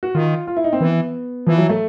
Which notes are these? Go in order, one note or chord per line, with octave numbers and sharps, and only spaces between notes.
F#4
D#3 F4
F4
E4
D#4
C4
E3 B3
E3 F3
F#3
A3